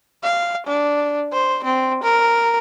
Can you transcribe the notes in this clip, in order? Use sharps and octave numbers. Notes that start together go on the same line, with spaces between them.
F5
D4
C5
C4
A#4